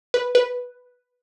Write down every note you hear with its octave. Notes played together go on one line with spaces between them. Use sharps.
B4
B4